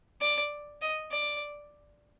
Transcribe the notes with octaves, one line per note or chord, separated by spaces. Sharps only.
D5
D#5
D5